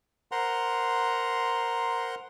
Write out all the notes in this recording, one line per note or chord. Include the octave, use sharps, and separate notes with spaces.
A#4 C5 F#5 A#5 C6